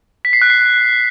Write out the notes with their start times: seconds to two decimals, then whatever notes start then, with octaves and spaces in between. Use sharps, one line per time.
0.25 B6
0.33 C7
0.42 F#6
0.50 C7